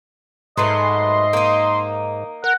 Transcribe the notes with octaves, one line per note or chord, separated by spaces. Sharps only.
G#2 F#3 A3 B4 D#5 C6
A#3 D#4
A#4 F#5